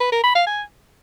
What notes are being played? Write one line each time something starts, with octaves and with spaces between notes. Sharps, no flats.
B4
A#4
B5
F5
G#5